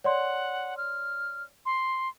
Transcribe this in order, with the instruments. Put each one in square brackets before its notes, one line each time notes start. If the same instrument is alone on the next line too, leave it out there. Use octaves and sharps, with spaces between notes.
[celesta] C#5 D5 C6 [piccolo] F#5
[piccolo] F6
C6